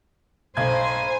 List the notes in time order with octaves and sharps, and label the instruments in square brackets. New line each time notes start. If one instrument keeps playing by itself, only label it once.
[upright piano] B1 G#6 [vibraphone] A4 A#5 B5 [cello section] C5 [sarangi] G#5